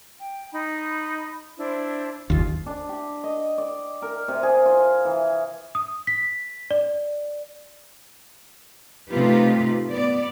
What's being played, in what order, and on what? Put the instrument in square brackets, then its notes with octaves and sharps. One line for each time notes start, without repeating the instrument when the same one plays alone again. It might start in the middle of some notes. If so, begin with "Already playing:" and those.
[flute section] G5
D#4 B5
D4 E4 C5
[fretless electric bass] F#1 D#2 [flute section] F4
[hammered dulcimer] D4
G4
D#5
D5
A#4
C3
G#4
F4
E3
[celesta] D#6
B6
D5
[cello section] C3 A3 D#4 F4 G4 B4
B3 D5